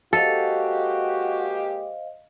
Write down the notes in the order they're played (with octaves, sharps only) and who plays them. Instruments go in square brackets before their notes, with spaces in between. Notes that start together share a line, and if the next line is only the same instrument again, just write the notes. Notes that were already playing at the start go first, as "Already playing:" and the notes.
[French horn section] G#3 A#3 G4 [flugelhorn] F#4 [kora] A4 [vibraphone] C5 D#5 F5